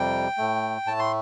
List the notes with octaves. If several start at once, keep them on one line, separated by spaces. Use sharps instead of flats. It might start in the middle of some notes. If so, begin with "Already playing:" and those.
Already playing: F2 C3 G3 G5
A2 A3
A2 A3 A5
C6